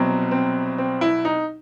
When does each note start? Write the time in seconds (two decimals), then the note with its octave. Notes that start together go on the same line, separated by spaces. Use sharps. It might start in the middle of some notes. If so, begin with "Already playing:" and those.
Already playing: C2 B2 F#3 C4
0.31 C4
0.78 C4
1.01 E4
1.25 D#4